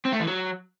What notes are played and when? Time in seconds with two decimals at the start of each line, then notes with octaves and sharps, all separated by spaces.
0.05 C4
0.13 A3
0.20 E3
0.28 F#3